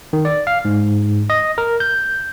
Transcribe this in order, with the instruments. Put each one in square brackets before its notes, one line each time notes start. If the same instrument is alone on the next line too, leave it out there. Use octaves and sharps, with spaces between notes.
[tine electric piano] D#3
D5
F5
G#2
D#5
A#4
G6